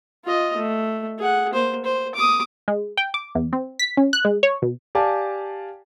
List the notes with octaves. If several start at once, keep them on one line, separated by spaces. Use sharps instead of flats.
F4 D#5
A3
G#4 F#5
A#3 C5
C5
D6 D#6
G#3
G5
D6
E2
C4
B6
C#4
F#6
G#3
C#5
B2
G4 D5 F5 G#5 A5